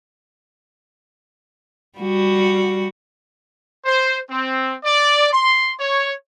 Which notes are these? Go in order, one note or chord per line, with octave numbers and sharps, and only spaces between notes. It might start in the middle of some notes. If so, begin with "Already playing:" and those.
G3 F#4
C5
C4
D5
C6
C#5